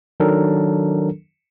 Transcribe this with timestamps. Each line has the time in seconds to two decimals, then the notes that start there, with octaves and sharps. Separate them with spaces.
0.20 D#3 F#3 D4 A4 A#4